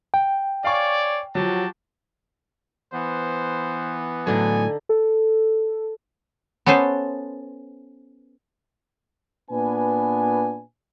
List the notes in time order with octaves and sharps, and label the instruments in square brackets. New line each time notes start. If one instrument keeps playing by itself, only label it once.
[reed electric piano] G5
[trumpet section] C#5 D5 [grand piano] F5 G#5 C#6
[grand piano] F3 F#3 [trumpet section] F#4 G4 A5
[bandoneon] E3 B3 [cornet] C5
[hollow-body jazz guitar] A2 F#3 [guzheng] D3 D4 D#4 [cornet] G#5
[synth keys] A4
[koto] B3 C#4 A4 B4 C5
[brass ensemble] A#2 B3 D4 B4 G#5